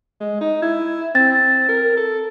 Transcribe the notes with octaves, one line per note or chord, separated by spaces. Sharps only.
G#3
D#4
E4 G#6
C4 A6
A#4
A4